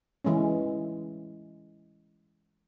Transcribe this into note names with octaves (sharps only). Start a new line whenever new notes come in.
E3 G#3 A3 C#4